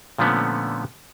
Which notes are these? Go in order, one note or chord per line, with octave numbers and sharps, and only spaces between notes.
A#2 D3 F3 A3 B3 C#4